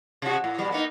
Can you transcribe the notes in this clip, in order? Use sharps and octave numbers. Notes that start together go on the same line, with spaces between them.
C3 F#4
A2
B2 G3
A#3 B3 D#4